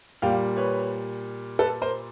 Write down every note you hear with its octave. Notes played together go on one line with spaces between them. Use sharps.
A#2 G3 F5 G5
B4 C#5
A4 B4
A#4 C5